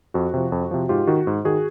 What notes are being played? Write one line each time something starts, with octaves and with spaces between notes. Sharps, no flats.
F2 F#4
C3 F3
F2
C3 F3
G#2 F4 G4
D#3 F#4
G#2
D#3 F#4 G#4